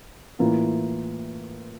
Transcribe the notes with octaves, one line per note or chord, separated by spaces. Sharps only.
A2 E3 A#3 F4